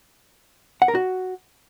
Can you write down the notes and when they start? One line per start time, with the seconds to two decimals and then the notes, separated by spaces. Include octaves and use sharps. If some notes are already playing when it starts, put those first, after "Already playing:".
0.82 F#5
0.88 A#4
0.95 F#4